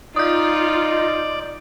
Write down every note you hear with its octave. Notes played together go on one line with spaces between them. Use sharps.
D#4 F4 D5 D#6 G6